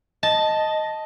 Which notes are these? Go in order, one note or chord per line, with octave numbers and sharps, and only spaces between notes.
D#5 A5